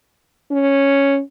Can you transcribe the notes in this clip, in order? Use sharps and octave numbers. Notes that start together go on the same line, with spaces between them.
C#4